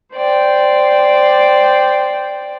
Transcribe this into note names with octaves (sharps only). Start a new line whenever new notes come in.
C5 D5 G5